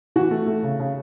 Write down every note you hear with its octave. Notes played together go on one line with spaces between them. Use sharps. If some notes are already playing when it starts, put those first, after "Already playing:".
E3 F#4
A3
A3
C#3
C#3